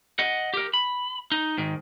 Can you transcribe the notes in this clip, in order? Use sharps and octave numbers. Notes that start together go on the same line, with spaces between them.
D#5 F#5
G4 A#4
B5
D#4
G#2 D#3